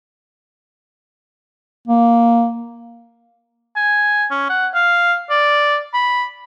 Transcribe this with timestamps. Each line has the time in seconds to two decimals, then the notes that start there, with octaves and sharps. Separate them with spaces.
1.87 A#3
3.76 G#5
4.31 C#4
4.50 F#5
4.75 F5
5.30 D5
5.94 B5